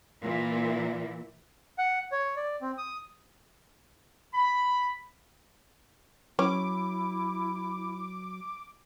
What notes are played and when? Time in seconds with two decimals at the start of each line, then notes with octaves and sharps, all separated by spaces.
0.22 A#2 E3 E4
1.78 F#5
2.12 C#5
2.36 D5
2.61 C4
2.78 D#6
4.33 B5
6.39 F#3 C#4 E4 D6